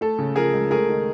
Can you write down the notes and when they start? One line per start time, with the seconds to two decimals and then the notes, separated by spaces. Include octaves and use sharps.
0.01 A3 A4
0.18 C#3
0.36 F3 G#4 A#4
0.53 C#2
0.70 A3 G#4 A#4
0.89 D#3